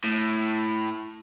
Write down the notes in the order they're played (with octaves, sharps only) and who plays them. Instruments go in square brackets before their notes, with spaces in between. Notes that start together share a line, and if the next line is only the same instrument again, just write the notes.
[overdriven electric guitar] A2